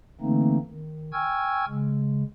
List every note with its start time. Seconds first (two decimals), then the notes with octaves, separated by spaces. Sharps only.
0.21 D3 E3 A3 A#3 C4 D#4
0.70 D#3
1.13 G5 G#5 C#6 E6 F6 G#6
1.68 C#3 G#3